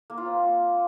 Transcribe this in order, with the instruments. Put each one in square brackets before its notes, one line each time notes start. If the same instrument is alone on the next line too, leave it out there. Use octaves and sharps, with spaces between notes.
[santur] A#3
F4
C4